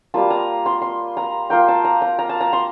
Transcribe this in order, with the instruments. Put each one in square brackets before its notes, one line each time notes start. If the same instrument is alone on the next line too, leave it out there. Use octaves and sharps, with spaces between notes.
[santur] G3 A#3 F4 A5
A#5
C6
C6
A#5
A#3 F4 G5
A5
A#5
A#5
A#5
A5
A#5
C6